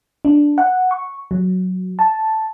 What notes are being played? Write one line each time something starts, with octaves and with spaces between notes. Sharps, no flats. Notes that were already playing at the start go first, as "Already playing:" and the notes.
D4
F#5
C#6
F#3
A5